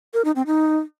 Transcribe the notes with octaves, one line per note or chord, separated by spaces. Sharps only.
A#4
D#4
C4
D#4